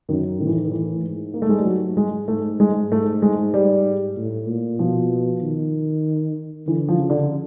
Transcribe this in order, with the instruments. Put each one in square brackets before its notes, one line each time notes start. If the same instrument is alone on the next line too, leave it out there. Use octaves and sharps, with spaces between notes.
[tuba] F#2 [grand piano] D#3
[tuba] A2 [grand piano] D#3
[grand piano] E3
D#3
D#3
E3
[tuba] G#2
[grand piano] A#3
A3
G#3
G3
F#3
G#3
[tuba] G#2 [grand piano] A3
[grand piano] G#3
[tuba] G#2 [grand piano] A3
[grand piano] G#3
G3
[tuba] A2
A#2
[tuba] B2 [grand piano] F3
[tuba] D#3
[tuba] D3 [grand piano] E3
[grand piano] F3
[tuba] C#3
[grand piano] D3